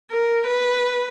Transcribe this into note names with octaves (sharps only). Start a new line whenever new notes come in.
A#4
B4